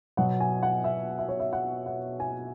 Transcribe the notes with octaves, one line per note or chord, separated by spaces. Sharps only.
B2 F#3 B3 F#5
G#5
F#5
E5
E5
C#5
E5
F#5
F#5
G#5